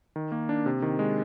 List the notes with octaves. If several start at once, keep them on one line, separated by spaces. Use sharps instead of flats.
D#3
A#3
D4
C3
D#3
G#3